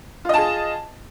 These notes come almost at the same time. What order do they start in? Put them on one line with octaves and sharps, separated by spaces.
F4 D#5 A5 G#4